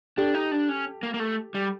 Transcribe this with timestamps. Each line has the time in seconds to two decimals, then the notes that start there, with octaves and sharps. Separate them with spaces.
0.17 D4 G4 A4
0.34 D#4
0.52 D4
0.69 C#4
1.03 A#3
1.14 A#3
1.20 A3
1.54 G3